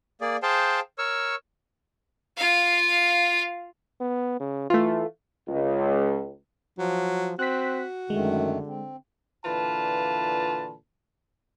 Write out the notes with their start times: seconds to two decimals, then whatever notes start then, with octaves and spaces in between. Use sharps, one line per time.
0.21 A#3 G#4 D5
0.43 G#4 C5 F5 G5 A5
0.98 A#4 C#5 C#6 E6
2.37 F4 F5
4.01 B3
4.40 C#3
4.70 E3 A3 F4
5.48 C#2
6.78 F3 F#3
7.39 C4 F#4 F#6 B6
8.10 F#2 D3 D#3 G#3 A3
8.67 C4
9.45 A#2 D3 E3 F4 B4 A5